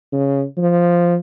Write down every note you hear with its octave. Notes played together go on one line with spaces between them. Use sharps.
C#3
F3